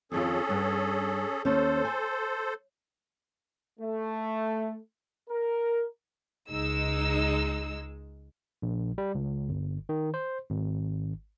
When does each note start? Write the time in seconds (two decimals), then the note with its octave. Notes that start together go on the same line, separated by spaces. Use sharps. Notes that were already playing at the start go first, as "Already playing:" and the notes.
0.12 F2 D#3 C#4 F4 G#4 A4
0.49 G2 F#5
1.45 D#2 C#4 A4 C5
1.85 G#5
3.80 A3
5.30 A#4
6.50 C#2 G#3 D#4 E6
8.62 A#1
8.98 G3
9.15 C#2
9.49 G1
9.89 D#3
10.14 C5
10.50 G#1